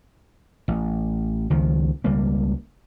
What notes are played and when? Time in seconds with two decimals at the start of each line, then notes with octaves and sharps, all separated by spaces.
0.68 A1
1.50 C#2 D#3 F3
2.04 C#2 G3 A#3